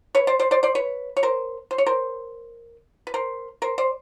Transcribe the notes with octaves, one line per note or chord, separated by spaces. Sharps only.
B4 C#5
C5 D5
C5 D5
C5 D5
C5 D5
B4 C#5
C#5
A#4 C5
C5
C#5
A#4 C5
B4
A#4 C5
A#4 C5
C5 D5